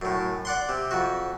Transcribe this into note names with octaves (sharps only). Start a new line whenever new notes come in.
F#2 A2
D5 F#5 C6
C3
F2 F#4